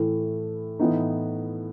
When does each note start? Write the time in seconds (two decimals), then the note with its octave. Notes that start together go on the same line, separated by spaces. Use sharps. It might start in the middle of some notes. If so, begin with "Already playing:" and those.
Already playing: A2 E3 A3 E4
0.79 A2 E3 B3 D#4